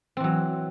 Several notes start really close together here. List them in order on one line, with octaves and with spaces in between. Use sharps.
C4 E3 F#3